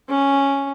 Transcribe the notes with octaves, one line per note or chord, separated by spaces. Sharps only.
C#4